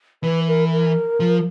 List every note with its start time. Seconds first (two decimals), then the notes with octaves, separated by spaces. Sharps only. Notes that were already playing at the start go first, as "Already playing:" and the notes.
0.23 E3 B4
0.48 A#4
0.72 A#4
1.20 F3